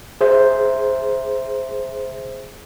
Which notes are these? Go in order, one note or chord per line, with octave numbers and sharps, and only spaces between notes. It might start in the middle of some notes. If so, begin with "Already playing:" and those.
G#4 C5 E5